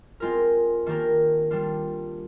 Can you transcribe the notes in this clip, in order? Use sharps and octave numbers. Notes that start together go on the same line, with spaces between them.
G#3 C4 F4 A#4
D#3 A#3 D4 G4 A#4
G3 D4 F4